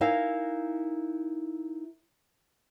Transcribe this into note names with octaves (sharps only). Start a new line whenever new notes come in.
D#4 E4 A#4 E5 F5 G#5